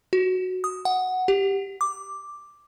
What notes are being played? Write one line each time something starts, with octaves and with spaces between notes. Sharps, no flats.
F#4
D#6
F#5
G4
D6